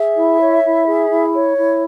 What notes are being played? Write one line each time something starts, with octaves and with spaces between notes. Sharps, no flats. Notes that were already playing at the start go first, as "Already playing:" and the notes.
Already playing: G#4 E5
E4
C#5
E4
G#4
E4
C#5
E4